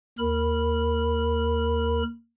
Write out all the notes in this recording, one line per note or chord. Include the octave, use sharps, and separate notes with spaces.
D#2 A#4 B5